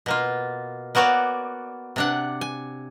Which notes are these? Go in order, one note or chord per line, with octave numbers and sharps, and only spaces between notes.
B2 A#3 F4
A#3 B3 F#4 C#5 D5
C3 D4 F#5
G#5